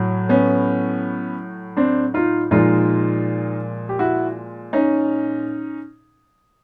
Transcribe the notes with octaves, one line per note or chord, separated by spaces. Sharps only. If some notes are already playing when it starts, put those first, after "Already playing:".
Already playing: A2 F#3
B3 C#4
C4 D4
D#4 F4
A#2 F3 G#3 D#4 F4
G4
E4 F#4
C#4 D#4